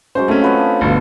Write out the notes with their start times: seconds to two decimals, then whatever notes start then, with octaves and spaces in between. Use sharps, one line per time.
0.15 F#3 G#3 C#4 C5
0.28 A3 C4 C#4 F#5 A5
0.42 F4 B4 D#5
0.58 D4
0.81 G1 D2 B2